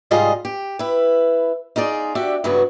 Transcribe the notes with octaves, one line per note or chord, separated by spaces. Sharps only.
G#2 C3 G3 F4 G#4 D#5
G4
E4 B4
D#4 F4 G#4 D5
D4 F#4 G4 D5 E5
G2 C#3 E3 F#3 B3 F#4